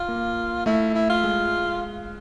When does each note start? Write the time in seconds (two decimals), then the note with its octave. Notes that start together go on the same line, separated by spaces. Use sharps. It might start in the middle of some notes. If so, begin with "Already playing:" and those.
Already playing: F4
0.09 A#3
0.66 A3 E4
0.95 E4
1.10 F4
1.24 G#3